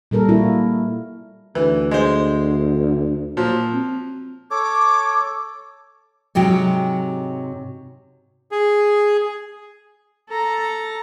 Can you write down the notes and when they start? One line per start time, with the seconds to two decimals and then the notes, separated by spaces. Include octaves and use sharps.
0.11 A#2 G3 A4 A#4
0.29 A#3 E4 F#4
1.55 D2 E3
1.91 G#3 C5
3.37 A#2 F3 F#3
3.73 C4
4.51 A4 C#5 D6
6.35 G#2 C3 F#3 G5
8.51 G#4
10.28 A4 A#5